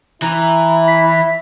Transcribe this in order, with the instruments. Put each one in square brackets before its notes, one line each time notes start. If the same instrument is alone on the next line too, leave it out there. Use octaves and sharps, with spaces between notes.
[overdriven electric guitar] E3 [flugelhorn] E4 [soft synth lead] A#5
[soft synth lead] B6